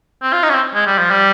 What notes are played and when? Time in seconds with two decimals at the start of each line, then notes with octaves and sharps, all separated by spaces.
0.23 C4
0.33 F4
0.43 D#4
0.49 C#4
0.54 C4
0.75 G#3
0.87 G3
0.98 F3
1.11 G3